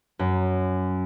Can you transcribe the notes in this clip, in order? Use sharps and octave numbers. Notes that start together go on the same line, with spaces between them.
F#2